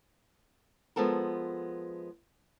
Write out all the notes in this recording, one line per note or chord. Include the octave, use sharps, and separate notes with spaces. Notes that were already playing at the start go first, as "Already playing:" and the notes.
F3 G#3 B3 A4 A#4